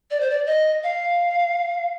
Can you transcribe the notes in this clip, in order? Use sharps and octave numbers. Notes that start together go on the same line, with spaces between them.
D5
C5
D5
D#5
F5